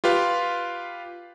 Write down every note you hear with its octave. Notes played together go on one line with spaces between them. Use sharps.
F4 G4 B4 F5